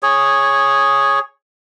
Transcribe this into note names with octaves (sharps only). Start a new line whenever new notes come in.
G#4 C#5